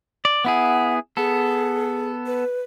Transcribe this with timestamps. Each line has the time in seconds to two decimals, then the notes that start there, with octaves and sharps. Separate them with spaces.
0.25 D5
0.45 B3 E4 G#4 F#5
1.17 B3 G#4 A4
2.26 B4